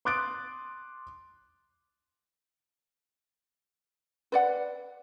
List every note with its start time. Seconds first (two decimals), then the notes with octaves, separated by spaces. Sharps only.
0.05 C6 D6 D#6 F#6 A6 D7
4.32 B4 D5 F#5